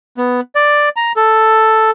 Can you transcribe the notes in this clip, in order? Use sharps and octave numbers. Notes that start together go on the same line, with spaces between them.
B3
D5
A#5
A4